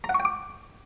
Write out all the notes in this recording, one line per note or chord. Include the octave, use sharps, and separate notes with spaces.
A#5
F#5
C#6
G5
D6